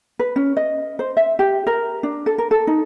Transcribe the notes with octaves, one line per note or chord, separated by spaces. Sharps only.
B4
C#4
D#5
C5
E5
G4
A#4
D4
A4
A#4
A4
D#4